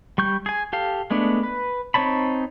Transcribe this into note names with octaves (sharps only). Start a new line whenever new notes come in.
G3 C#6 G6
G#4 G#5
G4 A4 F5
G#3 A3 B3 D4
B4
C4 D#4 C#5 A5 B5